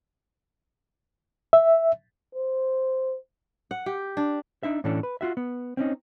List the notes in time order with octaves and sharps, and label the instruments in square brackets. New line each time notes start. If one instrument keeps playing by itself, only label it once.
[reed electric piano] E5
[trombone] C5
[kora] F#5
G4
D4
[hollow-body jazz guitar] D4 D#4 E5
A2 E3 A3 C#4 D4
B4
F4 F#4 E5
B3
C4 C#4 D#4